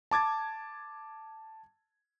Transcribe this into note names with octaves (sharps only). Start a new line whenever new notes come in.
A5 D6 G#6 A6